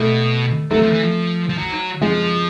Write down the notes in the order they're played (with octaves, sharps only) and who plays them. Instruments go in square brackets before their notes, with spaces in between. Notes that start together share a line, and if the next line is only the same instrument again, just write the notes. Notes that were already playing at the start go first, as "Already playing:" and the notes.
Already playing: [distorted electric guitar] B2 [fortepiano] A3
[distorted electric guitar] F#3 [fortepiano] A3
[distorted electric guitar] F3
E3
F3
F3
F#3
[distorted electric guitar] F3 [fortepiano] G#3